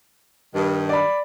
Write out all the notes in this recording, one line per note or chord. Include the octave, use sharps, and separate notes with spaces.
G2 D#3
D5 B5